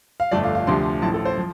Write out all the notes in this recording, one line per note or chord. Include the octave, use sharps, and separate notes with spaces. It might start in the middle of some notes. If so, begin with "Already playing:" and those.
F5
G1 F2 D3 A3 D4 D5
F5
F5
D2 C3 F3 D4 C6
A1 A2 F3 A5
A4
C5
F3